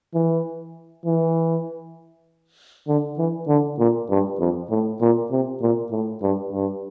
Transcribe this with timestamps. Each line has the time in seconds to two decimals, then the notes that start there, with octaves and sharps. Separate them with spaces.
0.14 E3
1.06 E3
2.88 D3
3.18 E3
3.48 D3
3.79 A#2
4.10 G2
4.39 F2
4.70 A2
5.01 A#2
5.31 C3
5.61 A#2
5.91 A2
6.22 G2
6.52 G2